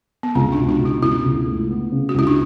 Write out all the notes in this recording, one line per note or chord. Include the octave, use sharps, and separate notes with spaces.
B3
C#2 C#4
D4
B2
D4
B2
E4
C#2 E4
C#2
A3
B3
C#3
F#4
C#2 E4
D4